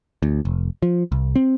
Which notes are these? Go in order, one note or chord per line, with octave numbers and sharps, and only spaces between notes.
D2
F1
F3
C2
C4